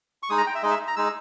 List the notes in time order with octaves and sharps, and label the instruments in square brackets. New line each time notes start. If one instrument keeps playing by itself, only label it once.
[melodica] C#6
G#3 D#4 D#6
A#5
G5
E5
G#3 D#4 D#5
E5
A#5
G#3 D#4 E6